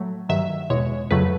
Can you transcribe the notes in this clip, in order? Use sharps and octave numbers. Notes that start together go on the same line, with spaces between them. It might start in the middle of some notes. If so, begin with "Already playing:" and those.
Already playing: A2 F#3 A3
G2 D#3 F#3 E5
E2 B2 G#3 C#5
F2 C#3 F#3 A3 B4